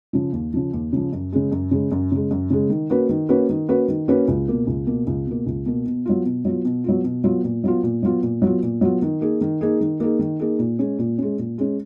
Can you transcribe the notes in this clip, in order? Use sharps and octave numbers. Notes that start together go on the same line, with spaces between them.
C#3 F3
D#2
C#3 F3
D#2
C#3 F3
F#2
C#3 G#3
F#2
C#3 G#3
F#2
C#3 G#3
F#2
C#3 G#3
D#3
A#3 C#4 F#4 B4
D#3
A#3 C#4 F#4 B4
D#3
A#3 C#4 F#4 B4
D#3
A#3 C#4 F#4 B4
C#2
B2 A#3
C#2
B2 A#3
C#2
B2 A#3
C#2
B2 A#3
B2
F#3 B3 F4
B2
F#3 B3 F4
B2
F#3 B3 F4
B2
F#3 B3 F4
A#2
F#3 B3 F4
A#2
F#3 B3 F4
A#2
F#3 B3 F4
A#2
F#3 B3 F4
D#3
A#3 D#4 G#4
D#3
A#3 D#4 G#4
D#3
A#3 D#4 G#4
D#3
A#3 D#4 G#4
A#2
G#3 C#4
A#2
G#3 C#4
A#2
G#3 C#4